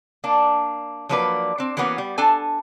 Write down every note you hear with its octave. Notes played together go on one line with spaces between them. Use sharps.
A#3 D4
F3 F#3 A#3 D4 B4 D5
C4 D4
E3 G3 A#3 B3 C#4 F#4
G3
D4 A4 G#5